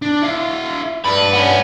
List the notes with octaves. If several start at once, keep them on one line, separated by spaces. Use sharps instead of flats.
D4
E4 F5
G2 B4 D5
B3 C#4